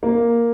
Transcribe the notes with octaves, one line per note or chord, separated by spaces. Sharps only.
A#3